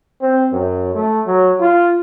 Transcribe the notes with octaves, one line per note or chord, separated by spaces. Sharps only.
C4
F#2
A3
F#3
F4